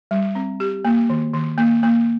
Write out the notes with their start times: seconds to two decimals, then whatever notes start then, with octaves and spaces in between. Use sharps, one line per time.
0.11 G3
0.35 C4
0.60 G4
0.85 A#3
1.10 D#3
1.34 D#3
1.58 A#3
1.83 A#3